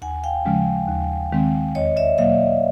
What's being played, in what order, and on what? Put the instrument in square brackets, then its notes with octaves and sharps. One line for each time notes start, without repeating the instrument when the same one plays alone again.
[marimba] D#2 [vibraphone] F#5 G#5
[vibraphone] F5 G5
[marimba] C#3 F3 G#3 C#4
D#2
D#3 G#3 C4
[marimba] E2 [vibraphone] C#5 D#5
[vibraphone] D5 E5
[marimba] B2 F#3 A#3 [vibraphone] D#5 F5